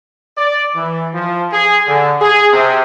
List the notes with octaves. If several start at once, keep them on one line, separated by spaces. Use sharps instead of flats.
D5
E3
F3
G#4
D3
G#4
C3